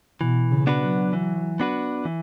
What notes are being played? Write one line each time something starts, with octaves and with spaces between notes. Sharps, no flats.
B2 E3
C#3
B3 D4 F#4 B4
F#3
E3
B3 D4 F#4 B4
E3